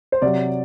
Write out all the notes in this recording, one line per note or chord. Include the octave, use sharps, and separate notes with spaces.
C5
C3 F#3 D5